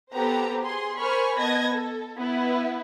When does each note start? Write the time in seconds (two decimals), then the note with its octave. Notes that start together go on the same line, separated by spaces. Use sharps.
0.14 B3 G4 A4 C5 A#5
0.64 G#4 C6
0.99 A#4 C5 G#5 B5 C#6 F6
1.39 B3 D#5 A5 G#6 A#6
1.74 A4
2.17 B3 E4 B4